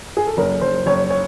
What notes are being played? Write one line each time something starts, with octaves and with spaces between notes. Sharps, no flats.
G#4
A4
F#1 A#4
F#1 C5
F#1 C#5
C#5